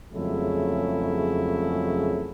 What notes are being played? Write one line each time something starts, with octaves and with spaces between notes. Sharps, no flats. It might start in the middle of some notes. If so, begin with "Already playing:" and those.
F2 C#3 F#3 G#3 A3 E4